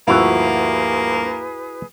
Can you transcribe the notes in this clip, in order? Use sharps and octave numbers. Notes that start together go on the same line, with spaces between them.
D2 G2 F3 A#3 E4 F#4 G#4 B4